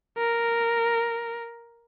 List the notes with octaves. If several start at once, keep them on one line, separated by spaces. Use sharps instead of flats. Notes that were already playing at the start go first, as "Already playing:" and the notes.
A#4